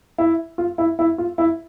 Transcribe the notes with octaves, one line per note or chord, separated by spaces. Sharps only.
E4
F4
E4
E4
F4
E4